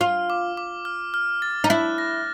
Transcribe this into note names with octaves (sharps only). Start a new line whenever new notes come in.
F4 F6
D6
D6
F6
F6
A6
D#4
E4 F#6
A#6